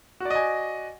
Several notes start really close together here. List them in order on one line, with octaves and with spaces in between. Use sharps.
F#4 D5 D#5 G#5